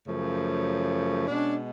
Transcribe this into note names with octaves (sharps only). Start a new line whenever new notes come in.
F#2 C#3 F3 A3
B2 G#3 C#4 D4